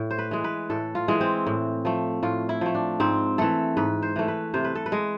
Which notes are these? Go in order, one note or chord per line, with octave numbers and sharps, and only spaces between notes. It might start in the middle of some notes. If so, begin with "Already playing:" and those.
Already playing: A2
C5
B4
E3 G#3
B4
A2 A4
F4
E3 G#3
C4
A2
F3 A3
A2 F4
E4
F3 A3
D4
G#2 C4
E3 A3 A4
G#2 B4
C5
E3 A3
B4
C3 C5
B4
A4
B4
G#3